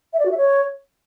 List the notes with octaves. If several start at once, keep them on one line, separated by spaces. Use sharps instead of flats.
E5
D5
F#4
E5
C#5